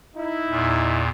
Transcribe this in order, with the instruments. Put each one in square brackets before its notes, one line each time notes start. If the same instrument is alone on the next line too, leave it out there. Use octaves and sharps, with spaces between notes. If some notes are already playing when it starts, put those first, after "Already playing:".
[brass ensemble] D#4 E4
[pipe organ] E2 A#2